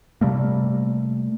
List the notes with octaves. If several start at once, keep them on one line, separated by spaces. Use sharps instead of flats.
C3 G3 A3 A#3